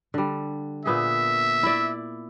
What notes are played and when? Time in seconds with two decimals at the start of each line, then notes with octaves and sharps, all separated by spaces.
0.14 D3 G3
0.86 A#2 B3 G#4 E5
1.63 E4 D5